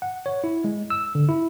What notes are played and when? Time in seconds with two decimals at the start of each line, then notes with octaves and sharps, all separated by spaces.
0.02 F#5
0.26 C#5
0.44 E4
0.64 G#3
0.90 E6
1.15 D3
1.29 E4